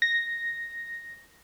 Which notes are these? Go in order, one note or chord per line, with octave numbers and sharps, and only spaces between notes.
A#6